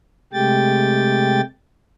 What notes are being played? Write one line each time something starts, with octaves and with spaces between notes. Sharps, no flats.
C3 G#3 A3 G4 G5 A6